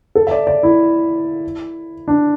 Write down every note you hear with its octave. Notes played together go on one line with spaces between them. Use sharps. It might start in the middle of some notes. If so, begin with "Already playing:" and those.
A4
E5
D5
D5
E4
D4